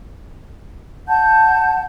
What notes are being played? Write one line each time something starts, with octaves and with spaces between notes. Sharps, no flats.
F#5 A5 G6